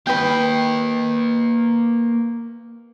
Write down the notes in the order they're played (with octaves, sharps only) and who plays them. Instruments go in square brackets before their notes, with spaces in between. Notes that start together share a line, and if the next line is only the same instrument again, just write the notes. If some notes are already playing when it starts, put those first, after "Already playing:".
[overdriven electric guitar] A#3 D#5 [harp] B4 G5